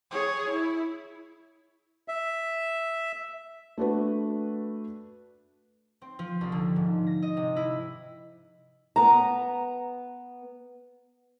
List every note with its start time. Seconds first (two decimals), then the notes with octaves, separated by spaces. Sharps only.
0.11 G#4 C#5
0.49 E4
2.08 E5
3.78 A3 D4 F#4 B4
6.01 C4
6.19 F3
6.41 C2
6.52 D3
6.76 G#2
7.07 A#6
7.22 D#5
7.37 C3
7.56 E4
8.96 B3 A#5